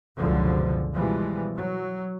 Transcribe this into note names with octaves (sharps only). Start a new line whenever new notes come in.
F#1 C#2 F#2 B2 D3 F3
B2 E3 F3 G3 G#3
F#3